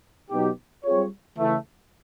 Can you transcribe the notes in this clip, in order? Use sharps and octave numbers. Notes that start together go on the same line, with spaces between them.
B2 F#3 B3 D#4 G4
G3 C4 F4 G#4 C#5
C#3 E3 A3